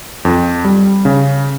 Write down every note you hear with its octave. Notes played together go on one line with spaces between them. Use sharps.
F2
G3
C#3